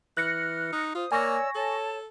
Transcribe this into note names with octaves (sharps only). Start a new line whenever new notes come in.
E3 F6 F#6 A#6 C#7
D#4
F4 C5 D#6
A#3 C#5 D5 G#5 C#6 E6 A#6
A4 C#5 A5